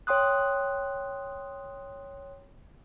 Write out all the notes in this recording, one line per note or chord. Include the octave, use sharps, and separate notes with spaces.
C#5 G5 C6 D#6 F#6